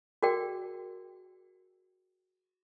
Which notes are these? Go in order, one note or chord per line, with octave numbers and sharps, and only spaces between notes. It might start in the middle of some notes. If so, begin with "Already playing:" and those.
F#4 G#4 A#4 D5 G5